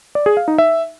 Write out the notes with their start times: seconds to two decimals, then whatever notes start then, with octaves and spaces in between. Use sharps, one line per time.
0.15 D5
0.26 G#4
0.37 F5
0.48 D#4
0.58 E5